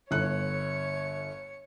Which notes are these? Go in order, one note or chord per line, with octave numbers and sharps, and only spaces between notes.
G1 C#5 F#6 C#7